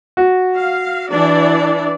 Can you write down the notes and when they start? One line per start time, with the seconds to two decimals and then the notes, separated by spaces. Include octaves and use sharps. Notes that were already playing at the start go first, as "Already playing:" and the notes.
0.17 F#4
0.55 F5
1.09 E3 D4 D5